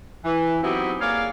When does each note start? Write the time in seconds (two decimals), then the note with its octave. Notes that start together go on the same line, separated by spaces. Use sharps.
0.24 E3
0.63 F#3 B3 C4 D#4 E4 G4
1.00 A#3 G#4 C#5 D5 F5